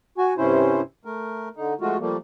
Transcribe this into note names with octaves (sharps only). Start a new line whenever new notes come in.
F#4 G#5
G2 C3 C#4 E4 C5
A3 A#4
D3 D#4
F3 G#3 A3 F4 F#4
F3 G3 A3 A#3